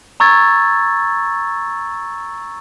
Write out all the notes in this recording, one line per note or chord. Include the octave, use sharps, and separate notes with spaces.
A#5 C#6 E6 G#6 A6